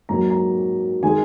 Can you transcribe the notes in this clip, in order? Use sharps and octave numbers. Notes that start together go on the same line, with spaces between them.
G#2 F#3 A#3 A#5
A#5
D#3 G#3 G#5